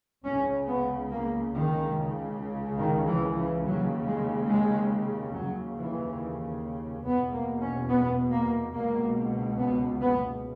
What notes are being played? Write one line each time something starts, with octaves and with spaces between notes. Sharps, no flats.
C#2 C#3 C#4
B3
A#3
D#3
C#2 C#3
D#3
E3
E3
D#2 C#3 F#3
G#3
G#3
D#2 C#3 F#3
E3
E2 B2 B3
A#3
C#4
B3
A#3
C#2 B2 A#3
B3
B3